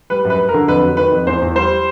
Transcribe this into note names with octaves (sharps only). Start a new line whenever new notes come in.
G3 B4
F#2
B4
F#2
A#4
D3
F2 B4
F#3
D#3 B4
F2
E2 C5
E2
G3 C5
G3